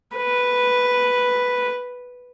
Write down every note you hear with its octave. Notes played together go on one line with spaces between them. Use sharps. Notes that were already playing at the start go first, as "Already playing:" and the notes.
B4